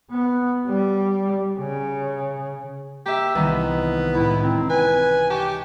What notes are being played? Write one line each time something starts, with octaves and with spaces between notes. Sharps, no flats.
B3
G3
C#3
A#3 G4 E5
C2 D#3 E3 B3
C#2 A2 E4
C4 A#4
B4 G#5
G4 A5 C#6